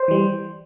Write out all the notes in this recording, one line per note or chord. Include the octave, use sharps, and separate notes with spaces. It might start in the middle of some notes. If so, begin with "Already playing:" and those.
Already playing: C5
E3 G3